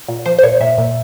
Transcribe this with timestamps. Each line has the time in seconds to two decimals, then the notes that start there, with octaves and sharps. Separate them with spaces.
0.08 A#2
0.26 F3 C5
0.38 C5
0.43 A#2 C#5
0.61 A#2 E5
0.78 A#2